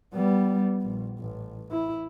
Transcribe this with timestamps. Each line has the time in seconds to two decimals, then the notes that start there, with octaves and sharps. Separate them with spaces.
0.14 G3 B3
0.81 A#1
1.19 A1
1.71 E4